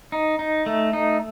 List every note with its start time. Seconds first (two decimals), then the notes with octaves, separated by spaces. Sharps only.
0.12 D#4
0.39 D#4
0.66 A3
0.93 D#4